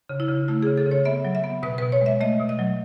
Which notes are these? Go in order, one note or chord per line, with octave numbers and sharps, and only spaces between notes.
C#3
E4
C#3
A3 E4
G#4
C#3
A4
C#3
C#5
B3 E5
F#3
E5
B3
B2 B4
B4
B2
C#5
G#3 E5
A3 D#5
B2
D#5
F#3